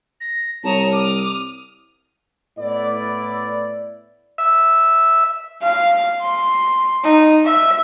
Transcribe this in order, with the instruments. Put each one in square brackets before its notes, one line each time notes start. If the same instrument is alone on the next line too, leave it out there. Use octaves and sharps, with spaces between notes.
[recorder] A#6
[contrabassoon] C2 [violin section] C#5 A#5 D#6 [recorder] A5
[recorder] D6 [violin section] D#6 F6
[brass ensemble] A2 B3 E4 D5
[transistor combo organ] E5
[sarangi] F5
C6
D#4
E5